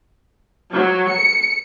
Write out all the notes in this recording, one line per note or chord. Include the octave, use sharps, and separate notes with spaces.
F#3
C#7